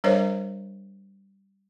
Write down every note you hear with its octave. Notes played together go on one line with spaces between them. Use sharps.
G3 D4 A#4 C5 C#5 D#5